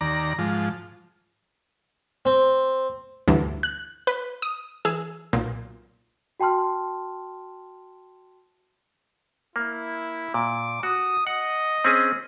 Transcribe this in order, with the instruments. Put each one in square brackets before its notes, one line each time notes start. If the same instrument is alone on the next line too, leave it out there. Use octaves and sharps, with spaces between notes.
[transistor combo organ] D#2 D5 A#5
G#2 F3
[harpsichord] C4
[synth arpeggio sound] D2 G2 D3 E3
F#6
B4
D#6
E3 G#4 E6
B1 A#2
[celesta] F#4 G5 A5 C6 F6
[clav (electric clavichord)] A#3 [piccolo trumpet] E4
[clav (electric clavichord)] A#2 [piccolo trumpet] D6
[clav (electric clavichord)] F#4 [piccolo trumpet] D#6
[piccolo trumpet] D#5 [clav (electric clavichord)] F#5
[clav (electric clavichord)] C4 C#4 G#4